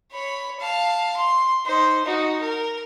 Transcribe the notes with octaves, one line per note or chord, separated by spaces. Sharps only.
C#5 B5
F5 A5
C6
D#4 C5
D#4 F#4
A#4